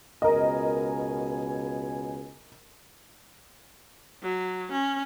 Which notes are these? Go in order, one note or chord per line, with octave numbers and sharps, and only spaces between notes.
C#2 B2 A#4 D#5 G#5
F#3
C#4